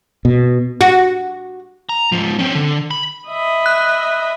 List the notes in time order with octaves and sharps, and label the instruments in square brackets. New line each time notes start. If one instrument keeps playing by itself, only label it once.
[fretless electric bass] B2
[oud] F#4
[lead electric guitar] A#5
G#2 F3
C4 C#4
D3
B5
[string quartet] D#5 E5 B5
[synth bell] F#6